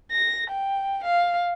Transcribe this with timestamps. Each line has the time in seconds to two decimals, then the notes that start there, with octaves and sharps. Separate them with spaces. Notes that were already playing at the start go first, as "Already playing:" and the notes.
0.12 A#6
0.50 G5
1.04 F5